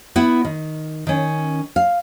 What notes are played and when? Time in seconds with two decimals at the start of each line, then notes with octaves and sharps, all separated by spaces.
0.16 B3 E4 E5 F#5
0.45 D#3
1.07 D#3 C#4
1.76 F5